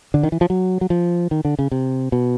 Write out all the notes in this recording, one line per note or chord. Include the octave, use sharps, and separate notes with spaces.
D3
D#3
E3
F3
F#3
F#3
F3
D#3
D3
C#3
C3
B2